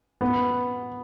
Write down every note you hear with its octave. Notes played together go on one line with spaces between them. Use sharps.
B3